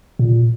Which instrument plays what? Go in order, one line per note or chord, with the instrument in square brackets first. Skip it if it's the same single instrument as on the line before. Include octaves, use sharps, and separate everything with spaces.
[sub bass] A#2